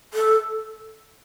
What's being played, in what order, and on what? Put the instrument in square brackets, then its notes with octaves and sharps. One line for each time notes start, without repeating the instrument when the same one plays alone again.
[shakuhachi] A4